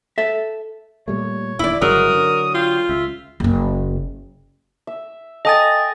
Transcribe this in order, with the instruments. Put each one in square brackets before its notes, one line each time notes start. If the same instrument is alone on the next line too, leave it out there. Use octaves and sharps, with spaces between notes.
[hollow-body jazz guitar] A4 E5
[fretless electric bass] A#2 G3 A3 [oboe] C#5
[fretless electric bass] D1 D#2 [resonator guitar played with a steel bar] E4 D5
[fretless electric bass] G1 C#3 G#3 [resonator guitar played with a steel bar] F#3 [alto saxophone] A#4 [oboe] D#6
[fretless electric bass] D3
[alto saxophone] F4 [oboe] G5
[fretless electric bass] C#2 [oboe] E5
[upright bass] F#1 A#3
[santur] E5
[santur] A4 G5 G#5 [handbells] D#5 D#6 A6